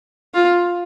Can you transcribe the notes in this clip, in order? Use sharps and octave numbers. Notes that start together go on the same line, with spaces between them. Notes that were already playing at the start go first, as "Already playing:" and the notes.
F4